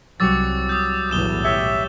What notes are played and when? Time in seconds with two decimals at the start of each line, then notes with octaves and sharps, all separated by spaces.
0.20 C2 F#3 G3 F#4 D6 E6 A6
0.69 D#6 G6
1.10 B1 E2 A2 D#6 E7 G7
1.44 G4 C#5 E5